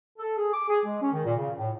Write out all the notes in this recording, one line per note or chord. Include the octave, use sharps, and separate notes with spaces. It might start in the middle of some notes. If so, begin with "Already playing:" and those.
A4
G#4
D6
G#4
G#3
C#4
D#3
A#2
C#3
A2